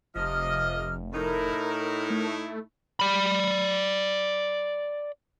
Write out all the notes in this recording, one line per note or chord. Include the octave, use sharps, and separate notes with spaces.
F1 C3 F3 D#5 F6
A2 D#4 E4 A#4
A3
D5 B5